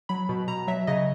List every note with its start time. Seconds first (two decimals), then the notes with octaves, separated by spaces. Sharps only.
0.09 F#3 B5
0.29 B2
0.48 B2 A#5
0.68 F#3 E5
0.87 C#3 D#5